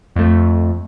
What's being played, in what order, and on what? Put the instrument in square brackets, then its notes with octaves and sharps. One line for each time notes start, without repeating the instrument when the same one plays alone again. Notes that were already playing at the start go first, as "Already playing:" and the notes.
[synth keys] F2 A3